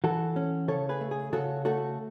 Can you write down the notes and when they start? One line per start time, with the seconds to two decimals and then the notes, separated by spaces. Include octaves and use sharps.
0.04 E3 F#4 A4
0.36 C#4
0.68 C#3 A4 C#5
0.89 G#4 B4
1.01 A3
1.11 G#4
1.33 C#3 F#4 A4
1.65 A3 F#4 A4